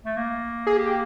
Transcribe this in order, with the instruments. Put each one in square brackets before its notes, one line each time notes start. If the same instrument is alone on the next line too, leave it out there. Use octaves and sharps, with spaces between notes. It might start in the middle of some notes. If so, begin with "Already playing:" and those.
[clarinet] A3
A#3
[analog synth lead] G#4
G4